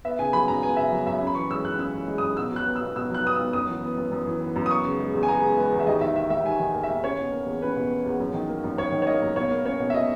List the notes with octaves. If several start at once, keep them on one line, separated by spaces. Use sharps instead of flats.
B3 E5
C#3 G#5
F#3 B5
F#2 A#5
B3 G#5
C#3 E5
F#3
F#2 E5
C#4
B5
E3 C#6
G#3 E6
F#2 F#6
C#4 E6
E3
G#3
D#6
F#2
B2 E6
F#3 F#6
B3
E6
B2
B2 E6
F#3 F#6
B3 D#6
E6
B2
F#2 D#6
E3
B3
F#2
F#2
E3
B3
F#2
D#6
B3 C#6
C#3
G#3
E2
G#5
B3 A#5
C#3
G#3 B4
E2
E5
D#2 D#5
D#3 E5
A#3 E5
D#2 E5
D#2 G#5
D#3
A#3
E5
D#2
C#4 C#5
B2
A#3
E2
C#4 B4
B2
A#3
E2
F#2
D#3
A#3
F#2
F#2 C#5
D#3
C#5
A#3 D#5
F#2
B2 C#5
A#3
C#4 C#5
B2
E5
B2 D#5